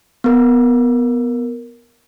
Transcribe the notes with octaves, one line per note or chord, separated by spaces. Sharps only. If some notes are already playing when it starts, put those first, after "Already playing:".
B3 A#4